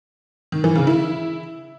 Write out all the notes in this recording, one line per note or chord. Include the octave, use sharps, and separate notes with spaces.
D#3
E3
C#3
E4